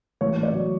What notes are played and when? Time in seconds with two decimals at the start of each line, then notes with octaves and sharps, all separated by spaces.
0.21 A1 C#5
0.37 A2
0.43 D5
0.54 F#3